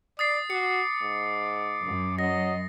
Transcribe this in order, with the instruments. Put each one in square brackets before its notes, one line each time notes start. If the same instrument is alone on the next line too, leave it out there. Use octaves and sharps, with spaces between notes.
[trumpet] D5 [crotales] D#6 A6 C7
[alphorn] F#4 [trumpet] D6 [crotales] C#7
[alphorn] G#2
[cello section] F#2
[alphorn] F#3 [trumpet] D#5 [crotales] A#6